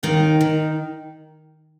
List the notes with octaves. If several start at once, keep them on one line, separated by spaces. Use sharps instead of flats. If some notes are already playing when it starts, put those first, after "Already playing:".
D#2 D#3 D#4
D#3